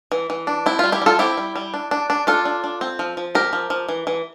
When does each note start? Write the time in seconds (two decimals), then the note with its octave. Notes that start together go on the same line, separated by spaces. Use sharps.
0.12 E3
0.30 E3
0.47 D4
0.66 C4 E4
0.79 G3 F4
0.92 E4 G4
1.02 G3 F4 A4
1.19 C4 E4 G4
1.37 G3
1.56 G3
1.74 D4
1.91 D4
2.10 D4
2.27 D4 F4 A4
2.45 D4
2.64 D4
2.81 C4
2.99 F3
3.17 F3
3.35 C4 G4 A#4
3.53 F3
3.70 F3
3.89 E3
4.07 E3